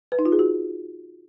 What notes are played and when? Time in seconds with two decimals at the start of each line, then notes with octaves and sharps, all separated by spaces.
0.12 B4
0.19 D#4
0.26 F4
0.32 G#4
0.39 F#4